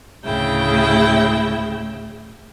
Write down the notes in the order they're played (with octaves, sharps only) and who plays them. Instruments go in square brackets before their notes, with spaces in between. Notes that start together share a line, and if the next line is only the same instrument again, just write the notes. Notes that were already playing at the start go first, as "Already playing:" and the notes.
[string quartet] D2 A2 C#3 E4 G5